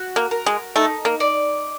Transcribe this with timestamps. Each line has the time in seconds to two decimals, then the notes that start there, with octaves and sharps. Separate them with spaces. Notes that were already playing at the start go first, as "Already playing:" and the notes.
Already playing: F#4
0.16 A#3
0.31 A#4
0.46 G#3
0.76 A3 D#4
1.05 A#3
1.20 D5